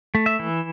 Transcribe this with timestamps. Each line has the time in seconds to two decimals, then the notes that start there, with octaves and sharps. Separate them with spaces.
0.15 A3
0.26 E5
0.39 E3